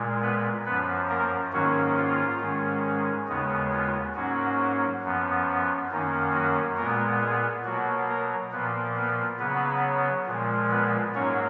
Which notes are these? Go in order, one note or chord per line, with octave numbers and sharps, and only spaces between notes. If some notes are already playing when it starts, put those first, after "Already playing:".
Already playing: A#2 G#3
B3 B4
F#2 F3 B3 B4
A#3 A#4
G#2 D#3 F#3 A#3 C#4 F#4
F4
G#2 D#3 G#3 C#4
D#2 C#3 G#3 B3 D#4
F4
G#2 F#3 A#3 C#4 F#4
F#2 F3 B3
F#2 D#3 A#3 C#4 D#4
F#3 F#4
A#2 G#3 A#3 B3 A#4
G#3 G#4
B2 F#3 A#3 F#4
A#3 A#4
A#2 F3 A#3 B3 B4
B3 B4
C#3 F#3 B3 B4
A#2 F3 G#3
B3 B4
G#2 F#3 A#3 C#4 C#5